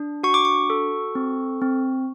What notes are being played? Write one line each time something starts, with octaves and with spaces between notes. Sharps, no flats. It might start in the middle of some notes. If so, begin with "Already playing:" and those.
Already playing: D4
F#4 C#6
D6
C#6
A4
C4
C4